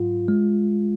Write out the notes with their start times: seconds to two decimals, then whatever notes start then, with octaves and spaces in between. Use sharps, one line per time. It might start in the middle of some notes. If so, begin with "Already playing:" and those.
Already playing: G#2 F#3 F4
0.28 G#3